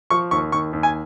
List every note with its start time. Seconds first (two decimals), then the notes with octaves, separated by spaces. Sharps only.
0.10 F3 C#6
0.31 D#2 C#6
0.52 D#2 C#6
0.73 D#2
0.83 G#5